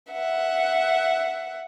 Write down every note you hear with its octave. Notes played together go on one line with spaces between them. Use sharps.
E5 F#5